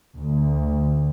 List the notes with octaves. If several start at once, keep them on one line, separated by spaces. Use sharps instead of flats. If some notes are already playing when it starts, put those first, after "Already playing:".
D2